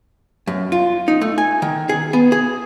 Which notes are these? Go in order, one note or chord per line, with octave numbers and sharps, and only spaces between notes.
F#2
F4
D#4
A3
G#5
D#3
G#4
B3
G#4